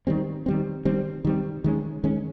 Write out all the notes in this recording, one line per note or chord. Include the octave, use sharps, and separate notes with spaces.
D#3 G3 C4
D#3 G3 C4
D#3 G3 C4
D#3 G3 C4
D#3 G#3 C#4
D#3 G#3 C#4